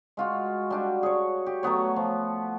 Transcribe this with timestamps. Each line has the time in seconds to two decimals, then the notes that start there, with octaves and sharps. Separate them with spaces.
0.17 G#3 F4 F#4
0.70 G3 D4 F#4
1.03 G#4 C#5
1.46 G4
1.63 F#3 A3 B3 C#5
1.96 F3